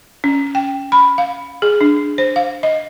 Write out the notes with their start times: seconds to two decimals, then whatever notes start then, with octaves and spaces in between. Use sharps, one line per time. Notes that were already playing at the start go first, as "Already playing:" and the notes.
0.24 C#4
0.55 G5
0.92 B5
1.18 F5
1.62 G#4
1.81 D4
2.18 C5
2.36 F5
2.63 D#5